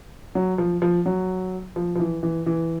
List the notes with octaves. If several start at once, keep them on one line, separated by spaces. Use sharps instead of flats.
F#3
F3
F3
F#3
F3
F3
E3
E3
E3